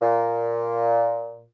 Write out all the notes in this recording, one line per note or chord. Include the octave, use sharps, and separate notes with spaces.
A#2